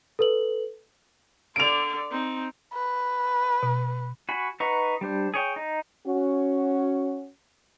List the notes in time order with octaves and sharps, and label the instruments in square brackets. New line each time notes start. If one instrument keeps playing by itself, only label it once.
[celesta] A4 B4 F#7
[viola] D3 D5 [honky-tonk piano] D7 F7
[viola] C4 D#4
[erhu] B4
[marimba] B2
[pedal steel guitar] F#4 G#5 B5
D#4 B4 F#5 A#5 C#6
G3 D4 C5
G#4 C#5 G5
D#4
[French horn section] C#4 F#4